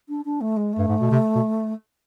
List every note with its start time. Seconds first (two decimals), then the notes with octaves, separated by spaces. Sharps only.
0.09 D4
0.25 D4
0.41 A3
0.56 G#3
0.73 A3
0.79 G2
0.88 G#2
1.01 B2
1.12 C3
1.36 B2